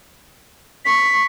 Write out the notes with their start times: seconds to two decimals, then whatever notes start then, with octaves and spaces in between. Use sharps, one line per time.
0.85 C#6 B6